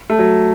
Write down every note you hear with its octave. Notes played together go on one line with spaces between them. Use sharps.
A3
F#3